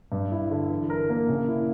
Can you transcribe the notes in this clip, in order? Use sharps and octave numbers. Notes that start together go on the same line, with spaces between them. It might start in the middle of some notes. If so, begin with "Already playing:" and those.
G2
E4
D3
E3
A#4
A#3
C#3
E4